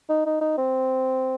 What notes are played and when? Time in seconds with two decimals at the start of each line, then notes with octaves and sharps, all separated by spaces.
0.09 D#4
0.26 D#4
0.41 D#4
0.57 C4